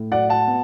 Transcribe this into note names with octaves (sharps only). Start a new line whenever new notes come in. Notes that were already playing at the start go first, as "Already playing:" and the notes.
Already playing: A2
F#3 D5 F#5
F#5 A5
B3